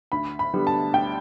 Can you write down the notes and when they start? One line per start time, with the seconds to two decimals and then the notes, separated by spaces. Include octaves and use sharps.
0.12 D2 B5
0.39 B5
0.53 D3 G3 B3
0.67 A5
0.94 D2 G5